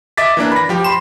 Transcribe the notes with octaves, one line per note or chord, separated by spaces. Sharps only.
D#5 E5 D6 A6 B6
E3 A#3 D4
B5 A#6
F3 G4
B5 C6 E7